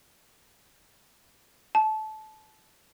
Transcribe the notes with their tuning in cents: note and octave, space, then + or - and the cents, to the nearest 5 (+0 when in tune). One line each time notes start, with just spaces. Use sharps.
A5 -20